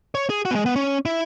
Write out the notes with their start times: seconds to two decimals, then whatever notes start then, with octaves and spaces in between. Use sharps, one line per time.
0.15 C#5
0.30 G#4
0.45 F#4
0.51 B3
0.55 G#3
0.66 B3
0.76 C#4
1.06 E4